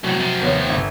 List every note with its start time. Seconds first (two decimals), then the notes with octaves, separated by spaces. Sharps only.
0.04 C2 A2 F#3
0.19 C3 F3
0.41 D#2 B3 C#5
0.70 G1 E5